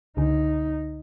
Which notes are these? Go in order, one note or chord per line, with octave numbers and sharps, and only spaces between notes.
C#2 D3 D#4